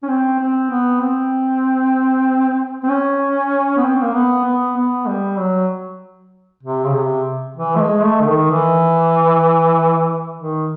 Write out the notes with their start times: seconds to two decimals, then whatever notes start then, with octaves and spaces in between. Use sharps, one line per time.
0.03 C#4
0.08 C4
0.39 C4
0.70 B3
1.01 C4
2.83 C4
2.89 C#4
3.78 B3
3.83 C4
4.02 A#3
4.14 B3
4.45 B3
4.76 B3
5.07 G3
5.38 F#3
6.63 C3
6.85 C#3
6.94 C3
7.57 E3
7.76 A3
7.80 G#3
8.04 A3
8.21 D3
8.27 D#3
8.50 E3
10.36 D#3